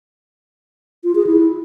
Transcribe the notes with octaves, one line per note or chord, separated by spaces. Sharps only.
F4
G#4
E4